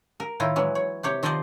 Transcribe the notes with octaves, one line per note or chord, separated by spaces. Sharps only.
A#4
A2 D#3 E4 F4
E3 F#3 G#3
C#5
C3 G4 C#5
D#3 F3 F4 C5 D5 D#5